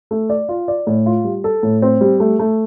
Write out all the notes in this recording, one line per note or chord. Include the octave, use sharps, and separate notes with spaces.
A3
D5
F4
D5
A2
F4
G3
A4
A2
C4
G3
A3
A3